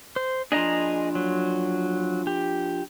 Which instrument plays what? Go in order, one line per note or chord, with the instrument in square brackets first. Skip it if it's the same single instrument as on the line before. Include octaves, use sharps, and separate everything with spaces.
[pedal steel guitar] C5
[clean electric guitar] F3 D4 [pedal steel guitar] G#4 D#5 A#5
[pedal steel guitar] F#3
G4